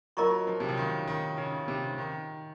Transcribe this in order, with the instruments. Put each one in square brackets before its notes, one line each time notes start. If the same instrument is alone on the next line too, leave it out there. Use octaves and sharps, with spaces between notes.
[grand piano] F#3 [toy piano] F4 A#4 D#5 A#5 C#6
[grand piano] F3
C3
C#3
D#3
D#3
C#3
C3
D#3